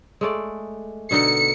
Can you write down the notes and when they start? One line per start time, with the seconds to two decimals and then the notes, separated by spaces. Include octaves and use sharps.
0.21 G#3 A3 D5
1.11 B2 D3 D#4 C#7